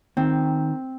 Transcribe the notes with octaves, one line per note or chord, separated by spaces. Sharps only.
D#3 C4